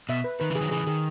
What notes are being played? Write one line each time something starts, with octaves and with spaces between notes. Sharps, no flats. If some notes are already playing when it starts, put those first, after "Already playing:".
B2 E5
B4
D#3 B4
C#3 E3
G#4
D#3 F#3
C#3 E3 G#4
D#3 G#4